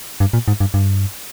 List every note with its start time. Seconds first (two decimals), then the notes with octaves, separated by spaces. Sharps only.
0.20 G2
0.33 A#2
0.48 G#2
0.60 G2
0.74 G2